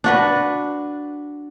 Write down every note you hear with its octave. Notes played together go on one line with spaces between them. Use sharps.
D4 F#4 B4